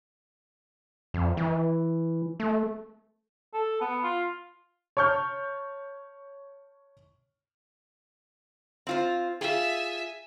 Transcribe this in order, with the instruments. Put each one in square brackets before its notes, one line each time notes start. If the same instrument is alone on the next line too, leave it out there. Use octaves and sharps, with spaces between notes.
[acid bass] F2
E3
A3
[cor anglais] A4
B3
F4
[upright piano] C#5 A5 C#6 F6 G6
[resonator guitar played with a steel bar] C4 F4 C5
[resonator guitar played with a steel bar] F4 G#4 [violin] E5 G#5